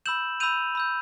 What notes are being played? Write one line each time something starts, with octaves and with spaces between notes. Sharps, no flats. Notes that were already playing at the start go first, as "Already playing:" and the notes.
B5 E6 G6 E7 F#7
B5 E6 G6 D#7 F7
B5 E6 G6